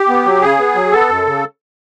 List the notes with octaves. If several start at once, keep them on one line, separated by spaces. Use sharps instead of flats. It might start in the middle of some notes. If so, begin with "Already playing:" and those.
Already playing: G4
B3
F#3
C#3 G#4
B3
F#3
B3 A4
F#2
C#3